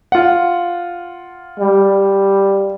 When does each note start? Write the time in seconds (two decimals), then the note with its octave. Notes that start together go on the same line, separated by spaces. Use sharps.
0.12 F4 F#5
1.60 G3